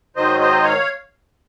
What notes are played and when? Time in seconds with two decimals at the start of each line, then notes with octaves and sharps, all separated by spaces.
0.16 G#2 D#3 F#3 C5 D#5
0.40 C5 D#5
0.64 C#5 F5